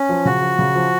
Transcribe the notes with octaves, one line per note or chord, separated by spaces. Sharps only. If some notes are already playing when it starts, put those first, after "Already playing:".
Already playing: C#4
F3
C#3 F#4
F3
C#3
F3